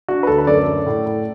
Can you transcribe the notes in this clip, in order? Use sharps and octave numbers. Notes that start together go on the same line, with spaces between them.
D4 F#4
B4
D2 A4
B4
F#2 A4 D5
F#2
A2
A2